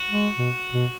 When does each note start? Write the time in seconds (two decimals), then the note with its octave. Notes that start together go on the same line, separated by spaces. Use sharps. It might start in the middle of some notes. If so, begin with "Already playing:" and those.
Already playing: F#4
0.10 G#3
0.37 B2
0.73 B2